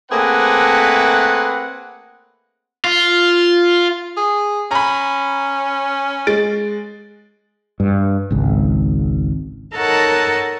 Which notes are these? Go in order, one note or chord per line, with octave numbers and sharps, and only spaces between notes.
A3 A#3 C4 G#4 B4 F#5
F4
G#4
C#4 A#5 B5
G#3 A6 D7
G2
G#1 C#2
D#4 A4 A#4 C#5 F#5 A5